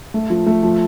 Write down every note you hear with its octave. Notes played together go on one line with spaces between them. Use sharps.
A3
F3
A3
F3